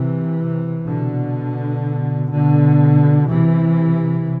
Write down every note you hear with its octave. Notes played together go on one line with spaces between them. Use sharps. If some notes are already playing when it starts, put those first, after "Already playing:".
Already playing: C3 E3
B2 D3
B2 D3
C3 E3